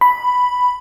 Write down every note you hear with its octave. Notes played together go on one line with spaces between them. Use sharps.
B5